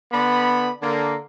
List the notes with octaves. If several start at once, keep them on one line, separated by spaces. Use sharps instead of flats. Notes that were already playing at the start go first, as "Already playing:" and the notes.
D3 B3 B5
D3 A#3